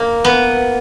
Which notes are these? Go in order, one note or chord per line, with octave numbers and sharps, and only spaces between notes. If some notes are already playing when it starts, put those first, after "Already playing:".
Already playing: A#3
B3